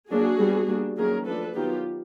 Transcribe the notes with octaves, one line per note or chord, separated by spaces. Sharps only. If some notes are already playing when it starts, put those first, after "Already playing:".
F#3 A#3 D4 F#4 G#4
G3 B3 D4
G3 A#3 D4
D#3 F#3 A#3 C#4 G#4 A#4
F3 A3 D4 A4 B4
D#3 F#3 B3 F4 G4